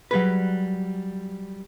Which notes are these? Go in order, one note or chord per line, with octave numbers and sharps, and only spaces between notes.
F#3 G3 G#4 B4